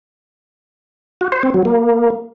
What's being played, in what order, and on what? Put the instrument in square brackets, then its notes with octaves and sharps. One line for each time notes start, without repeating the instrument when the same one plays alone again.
[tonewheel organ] F#4
C5
C4
F#3
A#3